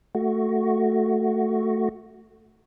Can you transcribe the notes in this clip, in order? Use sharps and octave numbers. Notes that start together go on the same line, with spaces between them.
A3 F#4